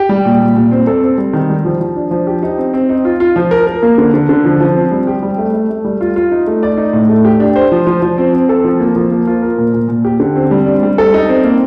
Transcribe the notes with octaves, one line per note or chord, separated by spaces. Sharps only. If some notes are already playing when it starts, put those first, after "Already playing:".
Already playing: G4
G3
A#2
A#2
A#2
C4
A4
C4
G3
D#3
G3
F3
F3
D4
F3
G4
D#4
C4
C4
D#4
F4
F4
F3
A#4
A#4
A#3
D3
D3
D3
F3
F3
C4
G3
G4
G3
A3
A3
A3
G3
F4
F4
D#4
A3
D5
D#4
A2
A3
G4
D4
C5
F3
F3
F3
C4
C4
A4
F3
A#3
F3
A#3
F4
A#4
A#2
A#2
A#2
G4
D3
C4
G3
D4
G3
A4
D#4
C4
A#3